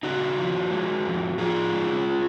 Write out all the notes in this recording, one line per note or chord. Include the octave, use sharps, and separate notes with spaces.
C#3 D#4 F#4
F3
G#3
F2
F3 F4 G#4
G#3